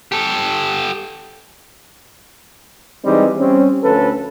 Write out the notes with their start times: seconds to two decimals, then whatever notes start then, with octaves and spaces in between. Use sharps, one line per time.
0.12 G4 A4
3.05 E3 G3 G#3 C4 D#4
3.39 G3 C4 C#4
3.84 D2 F3 C#4 A4 B4